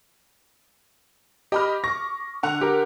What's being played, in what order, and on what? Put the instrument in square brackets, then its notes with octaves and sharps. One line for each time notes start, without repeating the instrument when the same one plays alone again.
[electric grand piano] G4 [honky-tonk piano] D#5 B5 F6
[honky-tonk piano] C#6 D6 [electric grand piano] A#6
[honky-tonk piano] D3 F#5 F7
[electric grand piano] G4 A#4